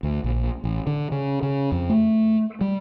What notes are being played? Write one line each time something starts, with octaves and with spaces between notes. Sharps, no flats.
D2
A#1
A1
D3
C#3
C#3
F2
A3
G3